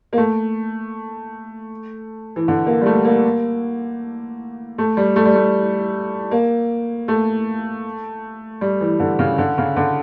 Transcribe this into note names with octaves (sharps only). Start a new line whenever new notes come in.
A#3
A3
E3
D3
A#3
G3
A3
A#3
A3
G3
A3
G3
A3
A#3
A3
G3
E3
D3
C#3
D3
C#3
D3